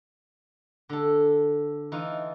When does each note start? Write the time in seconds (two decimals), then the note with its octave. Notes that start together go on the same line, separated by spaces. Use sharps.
0.89 D3 A4
1.92 E3 D#4 F4